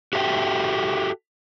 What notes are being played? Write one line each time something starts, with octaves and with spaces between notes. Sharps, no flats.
F#4 G4 A4 D#5 E5 G5